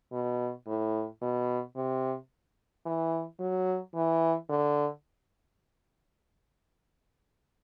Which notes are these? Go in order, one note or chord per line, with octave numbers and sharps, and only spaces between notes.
B2
A2
B2
C3
E3
F#3
E3
D3